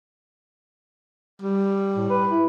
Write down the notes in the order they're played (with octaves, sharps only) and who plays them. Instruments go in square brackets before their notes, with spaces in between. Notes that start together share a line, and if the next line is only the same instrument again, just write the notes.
[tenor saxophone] G3
[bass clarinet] A2
B4
E4